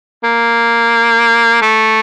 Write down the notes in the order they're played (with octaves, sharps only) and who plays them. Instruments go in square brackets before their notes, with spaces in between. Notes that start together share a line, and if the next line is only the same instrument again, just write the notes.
[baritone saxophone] A#3
A3